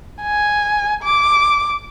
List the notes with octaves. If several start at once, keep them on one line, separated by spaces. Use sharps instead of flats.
G#5
D6